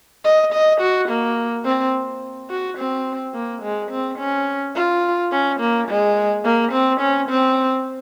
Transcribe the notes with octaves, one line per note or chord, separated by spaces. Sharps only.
D#5
D#5
F#4
A#3
C4
F#4
C4
A#3
G#3
C4
C#4
F4
C#4
A#3
G#3
A#3
C4
C#4
C4